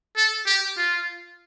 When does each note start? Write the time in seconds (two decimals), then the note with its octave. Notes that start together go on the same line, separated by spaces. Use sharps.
0.16 A4
0.46 G4
0.77 F4